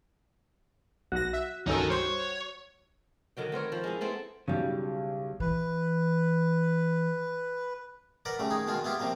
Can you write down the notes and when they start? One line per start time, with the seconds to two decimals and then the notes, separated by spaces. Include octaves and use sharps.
1.12 B1 F#4 A#6
1.33 E5
1.67 C#2 G2 F#3 C#4 D#4 A4 A#4
1.90 G3 C5 C#5
3.37 D3 D#3 F#3 G5
3.52 B3 C4 A#4 C#5
3.72 F3
3.84 G#3 D#4 E4
4.01 B3 C4 E4 A4
4.48 B1 C#3 G3
5.40 E3 B4
8.25 A#4 B4 D5 F#5
8.39 C#3 G3 A3
8.50 D#3 D#4 G#4
8.67 B2 D#3 G#3 F4
8.84 B3 E4 F4 G4
8.99 C3 F3 G3 A#3